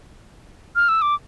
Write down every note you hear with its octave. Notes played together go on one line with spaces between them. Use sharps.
F6
E6
D6